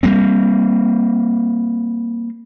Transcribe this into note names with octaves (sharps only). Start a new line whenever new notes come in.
G3 A3 A#3 C4